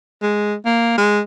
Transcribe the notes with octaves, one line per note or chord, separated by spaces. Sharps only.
G#3
A#3
G#3